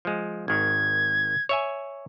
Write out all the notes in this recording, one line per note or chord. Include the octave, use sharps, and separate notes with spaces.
F3 G#3
G#1 D#3 G#6
C#5 E5 G#5